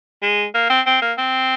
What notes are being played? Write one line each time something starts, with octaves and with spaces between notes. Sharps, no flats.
G#3
A#3
C4
C4
A#3
C4